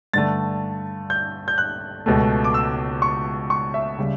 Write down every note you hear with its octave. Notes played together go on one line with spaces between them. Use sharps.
G2 D3 A3 A6
G6
G6
F#6
C#2 B2 A3
D6
E6
C#6
C#6
E5
C#3 G3